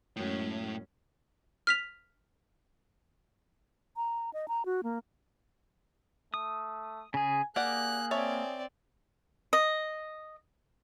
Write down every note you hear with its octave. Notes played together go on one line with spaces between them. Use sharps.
F#2 A2 G#3 C#4
F6 B6 F7
A#5
D#5
A#5
F#4
A#3
A3 D#6
C#3 G#4 G#5
A#3 G4 G#4 D5 F#5 F#6
C4 C#5 D5 E5 A5
D#5